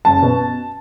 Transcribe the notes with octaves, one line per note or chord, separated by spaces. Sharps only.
F#1 A5
B2